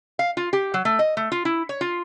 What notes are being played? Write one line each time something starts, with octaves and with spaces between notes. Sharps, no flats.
F5
F4
G4
F#3
A3
D#5
A3
F4
E4
C#5
F4